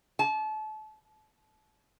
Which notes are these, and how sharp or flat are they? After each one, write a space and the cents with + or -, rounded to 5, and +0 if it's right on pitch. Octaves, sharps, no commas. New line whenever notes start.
A5 -30